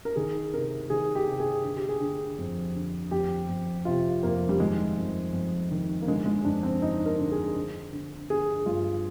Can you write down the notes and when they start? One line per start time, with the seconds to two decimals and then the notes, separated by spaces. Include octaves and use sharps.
0.05 A#4
0.16 D#3 G#4
0.54 C3 A#4
0.90 D#3 G#4
1.15 G4
1.28 C3
1.40 G#4
1.64 D3
1.77 G4
1.89 G#4
2.01 D3
2.38 F2
2.75 D3
3.11 F2 G4
3.49 F2
3.85 C3 F4
4.23 F2 A#3
4.49 G3
4.59 D#3 G#3
4.97 F2
5.33 F2
5.71 D#3
6.02 A#3
6.07 D3 G#3
6.26 G#3
6.45 F2 D4
6.63 C4
6.81 D3 D#4
7.06 A#4
7.19 D3
7.32 G#4
7.56 D3
7.92 D3
8.29 D3 G#4
8.66 G2 F4